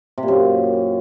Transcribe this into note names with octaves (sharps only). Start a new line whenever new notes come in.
C3
A#2
F#2